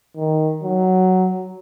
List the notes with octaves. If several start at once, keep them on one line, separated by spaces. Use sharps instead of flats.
D#3
F#3